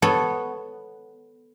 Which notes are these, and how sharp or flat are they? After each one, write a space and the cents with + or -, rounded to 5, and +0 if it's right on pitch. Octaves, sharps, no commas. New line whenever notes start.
B3 +0 A4 +0 C#5 +0